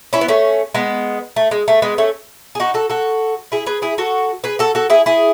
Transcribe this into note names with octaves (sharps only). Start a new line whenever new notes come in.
C#4 E4
B3
A3 C#4
G#3 B3
A3
G#3
A3
G#3 B3
A3 C#4
G#4
D#4 F#4
F#4 A4
F#4 A4
E4 G#4
G#4 B4
E4 G#4
F#4 A4
G#4 B4
F#4 A4
F#4 A4
E4 G#4
E4 G#4